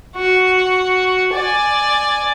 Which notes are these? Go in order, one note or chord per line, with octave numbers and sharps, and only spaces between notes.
F#4
D5 G#5